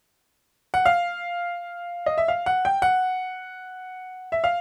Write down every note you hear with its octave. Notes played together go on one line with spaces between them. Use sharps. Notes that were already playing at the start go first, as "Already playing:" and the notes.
F#5
F5
D#5
E5
F5
F#5
G5
F#5
E5
F5